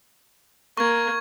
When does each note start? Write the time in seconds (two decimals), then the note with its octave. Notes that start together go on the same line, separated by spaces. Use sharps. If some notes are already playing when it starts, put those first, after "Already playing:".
0.77 A#3 C#6 G#6